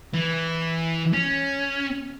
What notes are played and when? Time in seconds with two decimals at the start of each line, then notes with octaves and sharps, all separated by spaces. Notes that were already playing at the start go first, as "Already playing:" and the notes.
0.14 E3
1.14 C#4